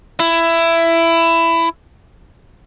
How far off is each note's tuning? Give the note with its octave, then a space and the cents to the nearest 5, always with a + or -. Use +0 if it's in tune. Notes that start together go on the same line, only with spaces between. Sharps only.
E4 +15